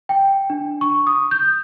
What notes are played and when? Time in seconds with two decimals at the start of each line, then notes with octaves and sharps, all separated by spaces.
0.09 G5
0.50 D4
0.81 C#6
1.07 D#6
1.31 G6